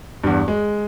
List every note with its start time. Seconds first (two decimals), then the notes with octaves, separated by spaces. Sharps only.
0.24 E2 G2
0.48 G#3